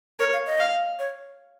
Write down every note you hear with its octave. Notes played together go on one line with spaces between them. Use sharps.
A#4 C#5
F5
D#5
F5
C#5